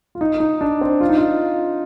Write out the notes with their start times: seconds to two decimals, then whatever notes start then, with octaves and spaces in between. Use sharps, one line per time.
0.15 F4
0.21 D#4
0.40 D#4
0.61 D4
0.81 C4
1.01 F4
1.09 D#4
1.18 F4